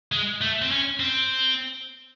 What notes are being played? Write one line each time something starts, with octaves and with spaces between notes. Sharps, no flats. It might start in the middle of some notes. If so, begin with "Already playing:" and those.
G#3
A3
C4
C#4
C4